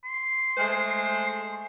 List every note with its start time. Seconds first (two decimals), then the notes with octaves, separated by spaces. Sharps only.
0.05 C6
0.56 G#3 A3 C5